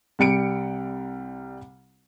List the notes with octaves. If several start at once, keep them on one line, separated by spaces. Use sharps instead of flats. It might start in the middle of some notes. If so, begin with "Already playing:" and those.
C2 G3 C#7 D7